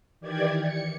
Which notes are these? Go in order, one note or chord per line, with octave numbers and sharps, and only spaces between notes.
D#3 E3 G4 D5 G#6
C#7